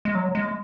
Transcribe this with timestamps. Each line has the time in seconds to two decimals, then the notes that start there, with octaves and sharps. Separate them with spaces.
0.05 G#3
0.15 F#3
0.35 G#3